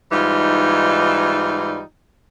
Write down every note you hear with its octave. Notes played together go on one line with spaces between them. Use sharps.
G#2 E3 G3 D#4 F4